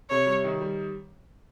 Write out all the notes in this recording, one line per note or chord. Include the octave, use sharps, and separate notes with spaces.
C3 C#5
G3
D#3
G3